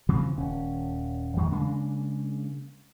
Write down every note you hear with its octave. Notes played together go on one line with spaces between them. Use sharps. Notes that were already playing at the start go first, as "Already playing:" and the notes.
C#3 E3 F3 C4
D#1 C#4
E2 D#3
C#3 G#3 A#3 D4